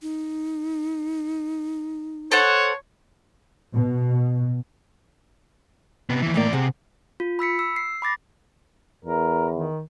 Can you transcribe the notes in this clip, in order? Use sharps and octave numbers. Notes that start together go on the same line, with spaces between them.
D#4
A4 C5 C#5 F#5
B2
C3 B3
D#2 E3
A2 D#3 E3 A#3 D5
C3 G#4 F#5
F4
B5 E6 B6 C#7
E6
C7
B5 D6 A6 A#6
E2 A#4
D#3